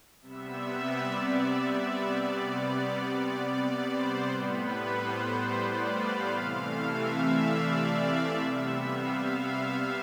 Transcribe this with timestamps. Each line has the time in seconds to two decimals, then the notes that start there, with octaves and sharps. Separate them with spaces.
0.21 C3 G3 B3 E5
0.71 D5
1.22 E5
1.73 D5
2.24 C3 G3 B3 D5
3.25 D5
3.76 C5
4.27 A2 G3 B3 B4
4.78 C5
5.30 D5
5.80 F5
6.31 C3 E3 A3 F5
6.82 E5
7.32 D5
7.84 E5
8.34 C3 G3 B3 E5
8.85 F5
9.36 E5